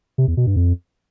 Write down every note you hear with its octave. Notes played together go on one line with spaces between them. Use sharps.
C3
E2
B2
G2
F2